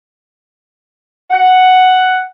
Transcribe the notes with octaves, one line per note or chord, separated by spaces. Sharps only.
F#5